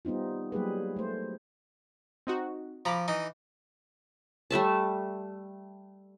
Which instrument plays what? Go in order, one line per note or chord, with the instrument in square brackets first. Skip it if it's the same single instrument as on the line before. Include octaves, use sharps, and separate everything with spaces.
[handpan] G3 B3 C4 D#4 F4
F#3 G3 A#3 G4 G#4 B4
A3 C5
[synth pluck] C4 D#4 F#4
[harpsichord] F3 [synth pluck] A#5 B5 D6
[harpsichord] E3 D#4
[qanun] G3 A3 E5 A5